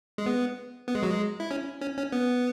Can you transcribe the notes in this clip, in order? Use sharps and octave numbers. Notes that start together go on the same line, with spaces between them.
G#3
B3
B3
G#3
F#3
G#3
E4
C#4
C#4
C#4
B3